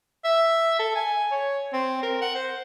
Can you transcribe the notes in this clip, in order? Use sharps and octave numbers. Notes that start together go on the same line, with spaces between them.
E5
A4
G#5
C#5
C4
A#4
F#5
C5